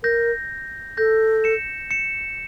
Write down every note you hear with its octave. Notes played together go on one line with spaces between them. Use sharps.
A#4 G6 A#6
A4 G6 A#6
C#7 E7
C#7 E7